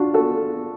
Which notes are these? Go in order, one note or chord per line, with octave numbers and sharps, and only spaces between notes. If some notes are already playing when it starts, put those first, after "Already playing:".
Already playing: D4 F4 F#4
F#4 A4